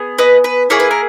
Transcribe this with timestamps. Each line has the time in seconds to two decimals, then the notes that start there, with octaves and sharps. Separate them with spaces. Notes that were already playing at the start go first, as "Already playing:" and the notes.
Already playing: B3 G#4
0.18 B4 D#5
0.44 B4
0.70 A#3 E4 G#4 C#5
0.80 B4
0.91 A#4